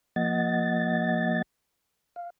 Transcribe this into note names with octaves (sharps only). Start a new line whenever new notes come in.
F3 A#3 D#5 F#5 A6
F5